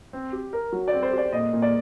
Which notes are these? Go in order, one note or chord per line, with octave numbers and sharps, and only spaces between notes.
C4
G4
A#4
F#3
C4 D5
C5
G4 D5
A#2 D#5
A#2
D5